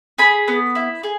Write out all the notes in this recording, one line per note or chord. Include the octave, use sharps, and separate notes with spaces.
G#4 B5
B3
E4
G#4